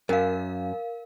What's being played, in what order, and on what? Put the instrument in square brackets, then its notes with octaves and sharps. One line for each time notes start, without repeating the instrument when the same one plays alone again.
[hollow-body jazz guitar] F#2 [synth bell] A#4 F5